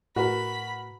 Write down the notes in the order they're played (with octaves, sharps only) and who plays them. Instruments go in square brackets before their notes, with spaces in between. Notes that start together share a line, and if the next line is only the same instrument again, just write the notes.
[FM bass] A2 [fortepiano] F#4 A#4 B4 [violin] B5